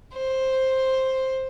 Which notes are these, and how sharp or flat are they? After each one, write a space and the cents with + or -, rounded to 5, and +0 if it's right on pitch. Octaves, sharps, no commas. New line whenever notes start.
C5 +5